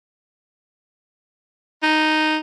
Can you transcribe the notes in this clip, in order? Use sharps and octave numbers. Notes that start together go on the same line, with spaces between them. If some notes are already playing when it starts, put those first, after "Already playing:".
D#4